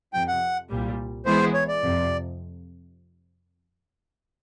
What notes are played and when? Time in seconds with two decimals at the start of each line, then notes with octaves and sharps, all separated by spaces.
0.13 F2 C3 F3 G5
0.28 F#5
0.70 C2 A#2 G3
1.25 E3 G#3 B3 E4 G#4 C5
1.54 C#5
1.68 D5
1.82 F2 C3 F3